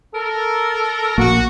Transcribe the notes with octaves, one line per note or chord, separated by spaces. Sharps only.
A4 A#4
A#1 A#3 F#4